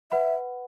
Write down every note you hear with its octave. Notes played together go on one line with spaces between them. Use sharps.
B4 E5 F#5 B5